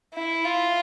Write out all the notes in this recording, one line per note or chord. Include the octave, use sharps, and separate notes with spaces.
E4
F4